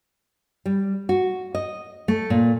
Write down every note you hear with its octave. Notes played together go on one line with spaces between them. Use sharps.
G3
F#4
D#5
A3
A#2